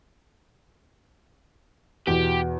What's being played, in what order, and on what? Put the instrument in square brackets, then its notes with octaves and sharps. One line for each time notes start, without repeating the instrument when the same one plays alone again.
[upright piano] E2 B2 [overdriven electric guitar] G4